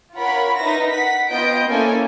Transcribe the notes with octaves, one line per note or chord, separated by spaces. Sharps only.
F4 A#4 C#5 F#5 B5
D#4 A#4 B4 E5 A#6
F#5 B6
B3 C4 F4 D#5 G6 D7
A#3 C#4 E4 A4 C#5 G#5